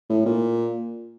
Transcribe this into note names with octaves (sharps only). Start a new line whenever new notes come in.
A2
A#2